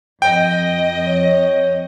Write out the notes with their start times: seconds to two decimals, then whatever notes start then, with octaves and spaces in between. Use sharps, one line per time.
0.22 F2 D#5 G5
1.07 C#5